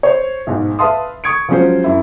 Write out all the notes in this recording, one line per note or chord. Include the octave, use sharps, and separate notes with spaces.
C5 C#5
B1 G#2
B4 E5 F5 A5 C6 D#6
C#6 D#6 G#6 C#7 D7
F3 F#3 G#3 C#4 F4 C5
F#2 E4